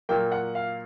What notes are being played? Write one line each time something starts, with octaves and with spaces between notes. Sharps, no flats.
A#2 F#3 A#3 G5
F#5
F5